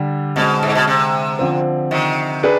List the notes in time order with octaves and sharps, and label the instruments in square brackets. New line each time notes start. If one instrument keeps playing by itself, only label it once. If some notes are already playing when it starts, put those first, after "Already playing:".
Already playing: [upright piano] D3 G3 D4 G4
[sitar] B2 [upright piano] D3 G#3 C4
[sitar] G#2
B2
C3
[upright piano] D3 F3 C4
[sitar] C3 D#3
[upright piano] D4 G#4 B4